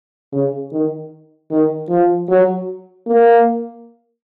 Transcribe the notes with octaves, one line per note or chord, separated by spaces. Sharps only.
C#3
D#3
D#3
F3
F#3
A#3